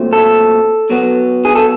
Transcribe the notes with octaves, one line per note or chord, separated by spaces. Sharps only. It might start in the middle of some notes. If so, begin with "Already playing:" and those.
Already playing: A#2 F#3 A3 C4
A4
B2 F#3 B3
G#4
A4